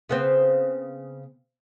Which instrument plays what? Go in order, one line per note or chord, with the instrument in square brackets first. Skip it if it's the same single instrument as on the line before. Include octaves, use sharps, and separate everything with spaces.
[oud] C#3 B3 C4